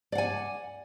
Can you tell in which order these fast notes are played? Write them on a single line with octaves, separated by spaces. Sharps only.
D5 F#5 G#5